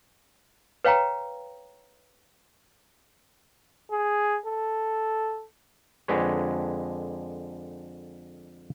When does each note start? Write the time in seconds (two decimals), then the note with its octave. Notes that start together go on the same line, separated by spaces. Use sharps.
0.84 B4 C#5 F5 G5 A#5
3.92 G#4
4.46 A4
6.08 F2 D3 G#3 B4 C#5